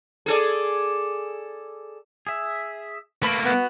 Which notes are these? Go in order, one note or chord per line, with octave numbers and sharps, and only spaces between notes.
G#4 A4 D5
G#4 E5
A3 A#3 B4 B5
B3 F#4